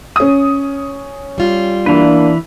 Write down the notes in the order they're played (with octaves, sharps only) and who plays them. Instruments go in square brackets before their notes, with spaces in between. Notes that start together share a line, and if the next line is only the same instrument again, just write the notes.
[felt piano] C#4 D#6
[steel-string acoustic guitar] G3 F4
[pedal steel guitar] E3 B4 [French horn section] A#3 D4